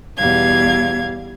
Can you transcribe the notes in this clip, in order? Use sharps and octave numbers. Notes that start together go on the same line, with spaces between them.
E2 B2 G3 F5 G#6